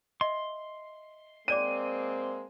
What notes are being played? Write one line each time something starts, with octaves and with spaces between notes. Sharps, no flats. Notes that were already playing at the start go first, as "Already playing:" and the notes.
D#5 E5 C6
G#3 A#3 C4 C#5 D5 D6 D#7